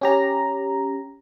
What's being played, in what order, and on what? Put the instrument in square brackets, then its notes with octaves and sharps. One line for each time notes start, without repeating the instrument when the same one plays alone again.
[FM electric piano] C#4 G4 A#5